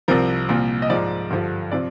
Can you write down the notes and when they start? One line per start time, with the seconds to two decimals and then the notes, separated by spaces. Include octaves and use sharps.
0.08 C2 C3 F3 A#4
0.49 C2 A#2 F3
0.82 D#5
0.90 G#2 F3 D5
1.30 G2 D3 F3
1.71 C3 F3 D5